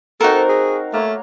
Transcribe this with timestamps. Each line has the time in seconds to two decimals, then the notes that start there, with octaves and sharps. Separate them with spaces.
0.21 C4 D#4 F#4 A4 A#4 F5
0.49 G#4
0.94 A3 A#3 C#5